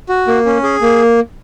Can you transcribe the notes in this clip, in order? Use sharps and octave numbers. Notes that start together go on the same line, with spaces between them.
F#4
A#3
C#4
G#4
A#3